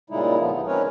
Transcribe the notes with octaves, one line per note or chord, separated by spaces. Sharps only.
A#2 C#3 G3 G#3 D#4 E4
D2 C#3 F3 B3
D#4
G#3 C4 C#4 A#4 B4 C#5